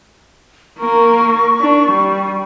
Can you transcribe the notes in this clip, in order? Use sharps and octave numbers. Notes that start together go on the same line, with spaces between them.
A#3 A#4 C#6
D4
G3